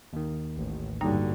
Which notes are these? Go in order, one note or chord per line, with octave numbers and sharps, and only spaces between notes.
D#2 D#3
A1
G2 D3 F#3 G3 A#3 D#4